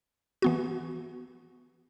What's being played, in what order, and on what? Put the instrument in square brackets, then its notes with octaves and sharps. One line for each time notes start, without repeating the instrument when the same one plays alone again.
[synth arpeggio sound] E3 B3 F#4